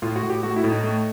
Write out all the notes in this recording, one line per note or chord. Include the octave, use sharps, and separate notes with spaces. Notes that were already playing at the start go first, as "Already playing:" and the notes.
A2 F4
F#4
A2
G4
A3 F#4
E4
A2
D#4
A3